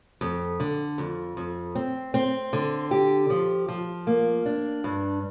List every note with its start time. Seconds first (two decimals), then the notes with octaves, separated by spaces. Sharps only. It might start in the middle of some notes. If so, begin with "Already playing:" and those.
0.21 F2
0.60 D3
0.98 F2
1.37 F2
1.75 C4
2.14 C4
2.53 D3
2.91 G4
3.30 F3
3.68 F3
4.07 A#3
4.46 D4
4.84 G2